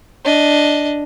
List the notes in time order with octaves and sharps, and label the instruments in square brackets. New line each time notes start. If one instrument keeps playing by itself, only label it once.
[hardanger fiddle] D4 D#5